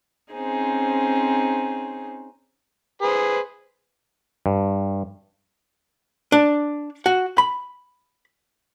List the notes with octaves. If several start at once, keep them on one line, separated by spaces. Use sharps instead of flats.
C4 C#4 D#4 G#4 C5
G#4 B4 C5
G2
D4
F#4
B5